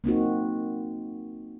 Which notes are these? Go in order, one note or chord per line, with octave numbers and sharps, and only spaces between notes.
A#3 C4 D#4 F#4